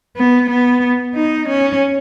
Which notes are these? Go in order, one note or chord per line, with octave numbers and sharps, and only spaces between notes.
B3
B3
D#4
C#4